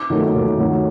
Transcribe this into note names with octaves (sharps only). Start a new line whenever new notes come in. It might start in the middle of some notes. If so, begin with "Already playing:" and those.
Already playing: D6
D#3 F#3 A3
D#2
D#3 F#3 A3